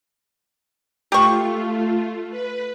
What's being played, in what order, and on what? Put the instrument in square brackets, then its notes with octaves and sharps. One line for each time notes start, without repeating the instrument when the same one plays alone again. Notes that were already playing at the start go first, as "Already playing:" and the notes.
[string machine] A3 F4 [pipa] G4 C#6
[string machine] B4